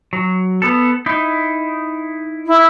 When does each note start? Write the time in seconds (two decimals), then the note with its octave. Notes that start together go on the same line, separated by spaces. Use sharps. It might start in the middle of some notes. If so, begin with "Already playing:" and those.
0.13 F#3
0.62 B3 A4
1.06 D#4 E4
2.47 E4